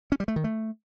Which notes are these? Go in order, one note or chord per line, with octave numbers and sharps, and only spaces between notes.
C#4
G3
A3
D#3
A3